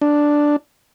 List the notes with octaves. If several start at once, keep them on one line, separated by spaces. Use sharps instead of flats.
D4